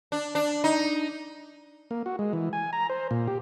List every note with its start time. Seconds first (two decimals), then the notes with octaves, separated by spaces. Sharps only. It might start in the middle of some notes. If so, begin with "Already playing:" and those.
0.12 D4
0.35 D4
0.64 D#4
1.91 A#3
2.06 F#4
2.19 G#3
2.33 E3
2.53 G#5
2.73 A#5
2.90 C5
3.11 A#2
3.27 G4